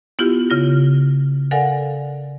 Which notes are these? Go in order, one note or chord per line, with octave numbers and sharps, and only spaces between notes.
B3 E4 F4 G4
C#3 F4 A#6
A4 A#4 D5 F5 F#5 G#5